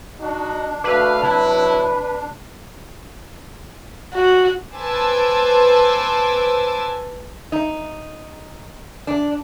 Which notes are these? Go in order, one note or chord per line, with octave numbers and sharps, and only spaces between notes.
D4 D#4 F#4
A3 F#4 B4 F5 D6 E6
C3 F#3 E4 A5
F#4
B4 C5 G#5 A5 D6 E6
D#4
D4